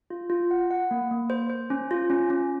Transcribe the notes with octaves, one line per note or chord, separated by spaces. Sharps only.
F4
F4
F#5
F#5
A#3
A#3
C5
C5
C#4
F4
C#4
C#4